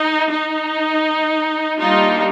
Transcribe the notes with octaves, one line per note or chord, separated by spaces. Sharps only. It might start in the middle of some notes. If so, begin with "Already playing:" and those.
Already playing: D#4
D#4
G3 A#3 D4 D#4 F4